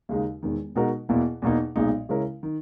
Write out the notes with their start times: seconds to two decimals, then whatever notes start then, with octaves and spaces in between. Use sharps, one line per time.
0.09 D#2 C#3 G#3 D#4
0.43 E1 E2 D#3
0.75 B2 G#3 D#4 F#4 A#4
1.09 E2 B2 A#3 E4
1.42 E2 B2 A#3 D#4
1.76 B1 A#2 G#3 D#4
2.09 C#3 G#3 C#4 E4 A#4
2.43 D#3